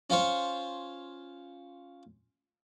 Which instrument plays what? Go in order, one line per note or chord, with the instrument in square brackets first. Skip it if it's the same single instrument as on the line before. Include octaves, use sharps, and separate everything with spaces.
[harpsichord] C#4 F4 C5 C#5